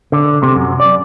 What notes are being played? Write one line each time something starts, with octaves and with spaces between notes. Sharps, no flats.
D3
C3
F#2
D5